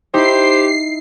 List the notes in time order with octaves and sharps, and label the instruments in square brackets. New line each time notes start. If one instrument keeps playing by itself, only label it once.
[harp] D#4 E4 [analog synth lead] G4 [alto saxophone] C5 [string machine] C7